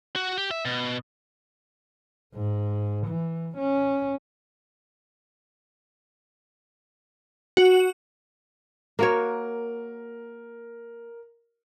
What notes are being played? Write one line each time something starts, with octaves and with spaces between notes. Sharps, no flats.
F#4
G4
E5
B2
G#2
E3
C#4
F#4
A#3 F#4 A#4 C#5